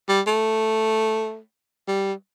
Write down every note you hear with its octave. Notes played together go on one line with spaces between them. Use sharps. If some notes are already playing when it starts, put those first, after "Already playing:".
G3
A3
G3